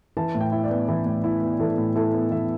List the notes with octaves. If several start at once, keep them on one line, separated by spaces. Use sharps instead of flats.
E3 A5
A2
G5
E4
D5
B3
E3
A2
E4
B3
E3 A4
A2
E4 A4
B3
E3 E5